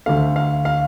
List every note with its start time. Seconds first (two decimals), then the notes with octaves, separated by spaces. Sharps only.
0.06 D2 D3 A3 F5
0.36 F5
0.65 F5